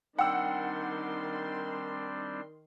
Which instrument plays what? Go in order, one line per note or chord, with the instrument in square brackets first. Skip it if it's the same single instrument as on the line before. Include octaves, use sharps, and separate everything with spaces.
[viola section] D#3 C6 [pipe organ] G3 C4 D4 [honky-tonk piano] F#5 E6 [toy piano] G5